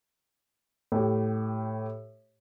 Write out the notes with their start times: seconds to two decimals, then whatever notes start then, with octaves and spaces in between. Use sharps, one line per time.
0.92 A2 G4